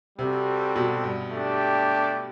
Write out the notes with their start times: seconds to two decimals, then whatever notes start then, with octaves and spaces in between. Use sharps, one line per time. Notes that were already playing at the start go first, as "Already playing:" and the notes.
0.19 C3 G3 C4 F#4 A4
0.76 B2
1.04 G2
1.32 A3 D4 G4